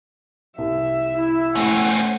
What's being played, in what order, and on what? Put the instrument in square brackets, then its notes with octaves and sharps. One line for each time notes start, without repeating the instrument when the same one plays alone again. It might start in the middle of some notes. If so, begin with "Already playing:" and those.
[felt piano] C2 [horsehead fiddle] E5
[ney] E4
[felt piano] A3 [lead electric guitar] C4 C#4 [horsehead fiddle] F#5